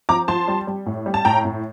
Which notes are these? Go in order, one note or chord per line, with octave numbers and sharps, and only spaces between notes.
F3 A#5 D6
F3 A5 C6
G3
G3
A2
G3
A5
A2 G5 A#5
A2